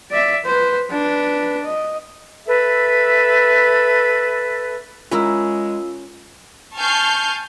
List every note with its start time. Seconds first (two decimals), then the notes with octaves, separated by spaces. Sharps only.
0.11 D5 E5
0.45 B4 C5
0.91 D4 B4
1.64 D#5
2.47 A4 B4 E5
5.11 G#3 C#4 E4 F4 A#4 E6
6.77 G#5 A5 C#6 F6 G6 C7